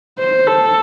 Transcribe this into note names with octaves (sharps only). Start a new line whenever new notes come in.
C5
A4